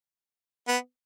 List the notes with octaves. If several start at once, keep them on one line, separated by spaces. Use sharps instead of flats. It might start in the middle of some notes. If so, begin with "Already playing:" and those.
B3